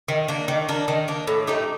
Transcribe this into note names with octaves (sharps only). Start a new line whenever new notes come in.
D#3
A#3 D4
D#3
A#3 D4
D#3
A#3 D4
A2
A3 D#4 G4